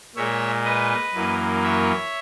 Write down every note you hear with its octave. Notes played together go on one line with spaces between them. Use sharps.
A#2 G#3 C#5 E5
B4 D#5
F#2 E3 A#3
C#5 E5